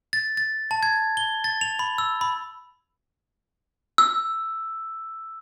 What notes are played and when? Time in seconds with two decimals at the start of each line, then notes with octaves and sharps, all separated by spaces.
0.13 A6
0.37 A6
0.71 A5
0.83 G#6
1.17 G7
1.44 A6
1.61 F7
1.79 B5
1.98 E6
2.21 B5
3.98 E6